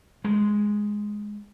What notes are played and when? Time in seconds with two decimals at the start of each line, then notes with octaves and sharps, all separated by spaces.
0.24 G#3